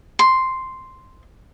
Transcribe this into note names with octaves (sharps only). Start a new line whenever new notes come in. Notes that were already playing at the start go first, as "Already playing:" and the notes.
C6